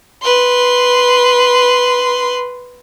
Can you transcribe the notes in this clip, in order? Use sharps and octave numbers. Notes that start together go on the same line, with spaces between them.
B4 C6